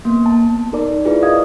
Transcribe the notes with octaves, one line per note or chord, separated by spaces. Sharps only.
A#3 B3
A5
D#4 A4 A#4 D5 D6
E4 F4 G#4 B4 D5
D#5 F5 D#6 G#6